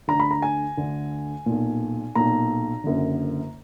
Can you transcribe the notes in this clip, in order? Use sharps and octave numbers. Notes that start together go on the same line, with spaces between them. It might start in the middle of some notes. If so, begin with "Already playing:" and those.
D2 D3 A#5
B5
A#5
G#5
D2 D3
B1 A#2
B1 A#2 A#5
F#1 F#2 D3